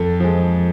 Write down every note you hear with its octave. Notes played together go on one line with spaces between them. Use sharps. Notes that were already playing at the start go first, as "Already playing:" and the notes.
Already playing: F2 A4
F3 G#3